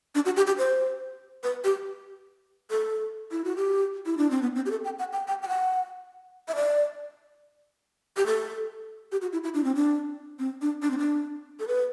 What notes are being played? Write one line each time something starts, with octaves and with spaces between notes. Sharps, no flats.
D4
F#4
G4
G4
C5
B4
G4
A4
E4
F#4
G4
E4
D4
C4
B3
C4
G4
A4
G5
F#5
G5
G5
G5
F#5
E5
D5
G4
A4
G4
F#4
E4
E4
D4
C4
D4
C4
D4
D4
C4
D4
A4
B4